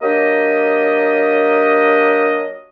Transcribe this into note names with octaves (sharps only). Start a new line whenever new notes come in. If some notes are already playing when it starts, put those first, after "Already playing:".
F#3 A#3 D4 G4 D#5